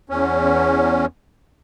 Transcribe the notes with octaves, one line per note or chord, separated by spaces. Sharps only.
E2 C#4